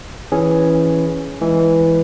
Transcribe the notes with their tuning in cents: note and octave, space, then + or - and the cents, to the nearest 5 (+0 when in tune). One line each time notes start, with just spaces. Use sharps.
E3 +0 C#4 +0 G#4 +0
E3 +0 G#3 +0